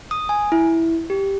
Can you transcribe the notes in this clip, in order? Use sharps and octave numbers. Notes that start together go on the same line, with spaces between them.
D#6
G#5
E4
G4